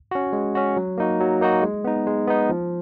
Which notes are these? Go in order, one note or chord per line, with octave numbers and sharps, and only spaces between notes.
C#4 F#4
G#3
C#4 F#4
F#3
A#3 D#4 F#4
F#3
A#3 D#4 F#4
G#3
B3 D#4
G#3
B3 D#4
F3